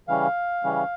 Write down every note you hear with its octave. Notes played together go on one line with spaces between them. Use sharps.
C#3 E3 G3 C#4 F5
C#3 E3 G3 C#4